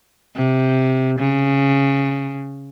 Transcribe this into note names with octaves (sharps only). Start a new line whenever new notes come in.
C3
C#3